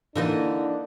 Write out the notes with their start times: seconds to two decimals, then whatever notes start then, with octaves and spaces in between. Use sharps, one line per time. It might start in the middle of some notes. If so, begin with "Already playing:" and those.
0.16 D3 E3 A#3 D4 D#4 D#5